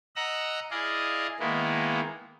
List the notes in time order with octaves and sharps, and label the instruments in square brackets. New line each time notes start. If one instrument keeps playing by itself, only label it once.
[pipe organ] D#5 F#5 A#5 E6 F#6
E4 G#4 D5 D#5 F5
D#3 G#3 A#3 B3 E4